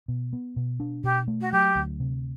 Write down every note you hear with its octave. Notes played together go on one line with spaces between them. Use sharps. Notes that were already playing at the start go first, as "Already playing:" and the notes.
B2
B3
B2
D4
B2 G4
A3
F#4
F#3 G4
D2
C3